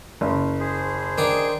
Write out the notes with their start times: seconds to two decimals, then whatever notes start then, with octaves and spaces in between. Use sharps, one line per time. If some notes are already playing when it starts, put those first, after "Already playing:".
0.21 F#1
0.60 G#4 C5
1.18 D#3 D4 D6